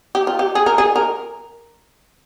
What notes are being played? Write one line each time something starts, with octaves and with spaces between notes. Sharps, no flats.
G4
F4
G4
G#4
A#4
G#4
A#4